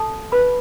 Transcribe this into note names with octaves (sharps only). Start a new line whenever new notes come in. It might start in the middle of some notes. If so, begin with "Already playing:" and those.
Already playing: A4 A5
B4 B5